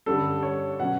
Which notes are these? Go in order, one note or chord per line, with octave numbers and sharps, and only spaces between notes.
G2 D3 G3 C#4 A4
C#5
B2 F#3 C#4 F#5